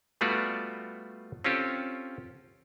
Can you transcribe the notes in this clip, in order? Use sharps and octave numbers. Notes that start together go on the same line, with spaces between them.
G3 A3 B3 F4 F#4 D5
C4 C#4 F4 G4 A4